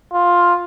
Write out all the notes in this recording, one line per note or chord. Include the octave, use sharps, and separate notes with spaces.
F4